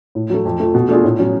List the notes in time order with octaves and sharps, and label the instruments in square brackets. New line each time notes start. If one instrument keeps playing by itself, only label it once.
[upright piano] A2
F#3 A3
F2
F3 A3
B2
A3 D4 F4 G#4
A2
F#3 C#4